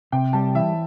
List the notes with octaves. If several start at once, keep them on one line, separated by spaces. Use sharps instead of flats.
C3 G5
G3 A5
E3 E5